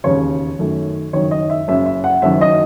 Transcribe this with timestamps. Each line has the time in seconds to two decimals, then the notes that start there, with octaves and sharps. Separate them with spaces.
0.04 E1 D#2 C#3 C#5
0.59 F#2 D#3 A3
1.13 F#1 F#2 D#3 C#5
1.31 D#5
1.50 E5
1.68 F#1 F#2 C#3 E5
1.86 E5
2.04 F#5
2.22 F#1 F#2 D#3 F#3 E5
2.41 D#5